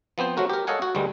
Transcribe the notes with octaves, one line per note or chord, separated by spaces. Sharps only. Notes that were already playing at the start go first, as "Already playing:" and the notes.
F3 B3 C4 C5
F#3 A3 F#4 A#4
G4 A#4
A4 C#5 D#5 F5 F#5 G#5
F#4
D2 G2 G3 G#3